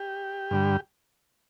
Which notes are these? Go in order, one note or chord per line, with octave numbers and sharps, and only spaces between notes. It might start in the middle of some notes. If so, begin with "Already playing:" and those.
Already playing: G4
G2 D3 G3